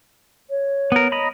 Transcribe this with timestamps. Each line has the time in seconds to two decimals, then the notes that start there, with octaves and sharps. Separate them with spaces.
0.50 C#5
0.92 B3 A#4
1.12 D#5 A#5 B5